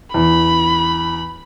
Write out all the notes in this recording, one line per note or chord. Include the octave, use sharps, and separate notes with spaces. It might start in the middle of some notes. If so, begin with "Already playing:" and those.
E2 B5